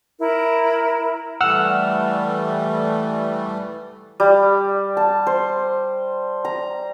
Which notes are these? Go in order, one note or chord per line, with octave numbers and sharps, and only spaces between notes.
E4 A#4
E3 G3 A3 F#5 E6 F6
G3
A5
C5
A#5